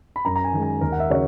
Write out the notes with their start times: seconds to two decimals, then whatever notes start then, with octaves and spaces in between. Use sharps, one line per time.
0.16 B5
0.25 F#2 A#5
0.36 A#5
0.44 G#5
0.53 D#3 G#3
0.63 G#5
0.81 D#2 A#4
0.92 F#5
1.00 E5
1.09 C#3 F#3 C#5